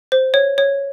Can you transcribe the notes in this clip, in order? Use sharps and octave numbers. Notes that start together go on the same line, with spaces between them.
C5
C#5
C#5